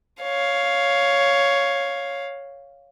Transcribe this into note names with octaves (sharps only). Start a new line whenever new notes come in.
C#5 F5